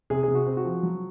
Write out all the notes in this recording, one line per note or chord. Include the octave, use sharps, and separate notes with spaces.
C3 G#4
C3 G#4
F#4
C4
F#4
F3
F#3